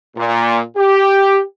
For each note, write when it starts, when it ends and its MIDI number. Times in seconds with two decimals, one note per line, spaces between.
0.16 0.59 46
0.77 1.41 67